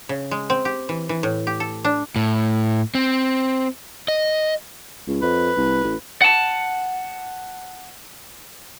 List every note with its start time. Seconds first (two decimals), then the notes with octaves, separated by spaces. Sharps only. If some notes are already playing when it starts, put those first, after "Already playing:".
0.09 C#3
0.31 G#3
0.50 C4
0.65 G4
0.89 E3
1.09 E3
1.23 A2
1.47 G4
1.60 A4
1.85 D4
2.16 A2
2.95 C4
4.08 D#5
5.07 C#2
5.22 F2 B4
5.57 C2
5.84 A1
6.22 F#5 A5